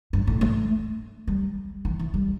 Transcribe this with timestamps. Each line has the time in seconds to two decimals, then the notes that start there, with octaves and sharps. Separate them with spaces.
0.13 G2
0.27 A2
0.41 A3
1.27 G3
1.85 E3
1.99 E3
2.14 G3